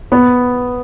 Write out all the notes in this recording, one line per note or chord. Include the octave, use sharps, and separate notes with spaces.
B3